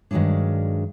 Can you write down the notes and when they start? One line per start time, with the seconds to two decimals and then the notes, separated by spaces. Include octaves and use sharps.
0.11 G2 D#3 E3 F#3 G#3 D4